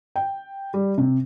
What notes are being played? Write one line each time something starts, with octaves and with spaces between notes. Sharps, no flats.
G5
G3
C3